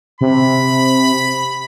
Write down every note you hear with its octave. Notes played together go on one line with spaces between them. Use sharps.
C3 B5